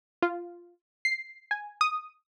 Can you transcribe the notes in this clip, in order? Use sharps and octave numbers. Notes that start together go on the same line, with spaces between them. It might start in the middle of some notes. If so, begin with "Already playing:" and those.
F4
C7
G#5
D#6